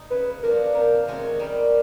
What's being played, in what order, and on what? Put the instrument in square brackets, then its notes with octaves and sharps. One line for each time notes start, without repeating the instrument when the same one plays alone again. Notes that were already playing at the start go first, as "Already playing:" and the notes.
Already playing: [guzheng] D#4
[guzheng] C#3 [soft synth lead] B4
[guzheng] F3 A#3 D4 F#4 [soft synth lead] A#4
[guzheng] C3 [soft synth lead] A#4
[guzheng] D#3 G#3 C#4 F#4
[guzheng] G3 [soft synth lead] A#4